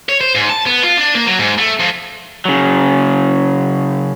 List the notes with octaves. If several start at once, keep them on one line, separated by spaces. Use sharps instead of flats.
C#5
C5
G#2
A5
B3
F4
D4
A#3
F#3
G#2
A3
F2
C#3 F#3